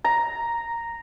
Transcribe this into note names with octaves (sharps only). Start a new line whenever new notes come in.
A#5